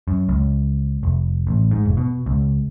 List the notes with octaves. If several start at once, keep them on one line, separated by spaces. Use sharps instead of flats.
F#2
C#2
F1
A1
G#2
F1
B2
C#2